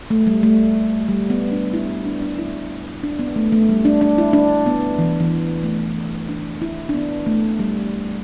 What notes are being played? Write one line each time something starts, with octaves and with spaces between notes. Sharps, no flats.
A3
G3
A3
G3
B3
D4
E4
D4
D4
D4
E4
D4
B3
A3
A3
G3
D4
D4
E4
D4
B3
E3
E3
A3
D4
E4
D4
B3
A3
G3